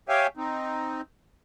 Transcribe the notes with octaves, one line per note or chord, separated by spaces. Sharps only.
G4 C#5 E5 F5 G5 G#5
C4 D#4